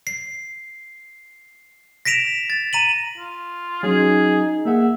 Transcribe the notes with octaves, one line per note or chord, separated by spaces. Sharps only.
C7
A#6 B6 D7 E7 F7
A6
A#5 D#7 F#7
F4
F#3 C#4 D#4 G#4
A#3 G#4 E5 F#5